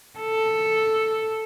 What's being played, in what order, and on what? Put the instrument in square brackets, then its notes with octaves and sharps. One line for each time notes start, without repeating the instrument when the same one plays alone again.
[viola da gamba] A4